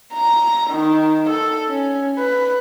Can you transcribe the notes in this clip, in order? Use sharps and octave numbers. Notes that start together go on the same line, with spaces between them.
A#5
D#3
A4
C#4
B4